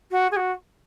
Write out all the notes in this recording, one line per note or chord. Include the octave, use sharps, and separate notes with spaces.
F#4
G#4
F#4